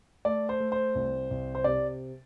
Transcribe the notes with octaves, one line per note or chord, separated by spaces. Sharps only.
A3 D5
C5
A3
C5
C2
C2
C5
C3 D5